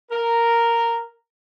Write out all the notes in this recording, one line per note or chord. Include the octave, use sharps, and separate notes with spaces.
A#4